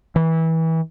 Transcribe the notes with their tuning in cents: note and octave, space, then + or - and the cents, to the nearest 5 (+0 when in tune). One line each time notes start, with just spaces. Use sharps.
E3 -25